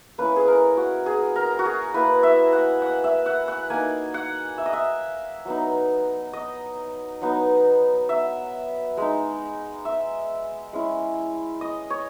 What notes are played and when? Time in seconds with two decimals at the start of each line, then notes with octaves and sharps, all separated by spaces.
0.18 A#3 C#4 E4 B4
0.36 G#4
0.48 A#4
0.77 F#4
1.06 G#4
1.36 A#4
1.59 F#4
1.65 G#4
1.94 A#3 E4 B4
2.23 E5
2.53 F#5
2.82 F#5
3.04 E5
3.26 F#5
3.48 F#5
3.70 A#3 D#4 G#5
4.14 F#5
4.58 E5
4.66 D#5
4.73 E5
5.45 F#3 B3 D#4
6.33 D#5
7.21 F#3 B3 D#4
8.09 E5
8.97 G#3 D#4
9.85 E5
10.73 G#3 C#4 E4
11.61 D#5
11.90 C#5